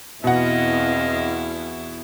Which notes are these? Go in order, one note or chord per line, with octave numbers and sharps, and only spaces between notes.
E2 B2 E3 C4 E4 D#5 F5 F#5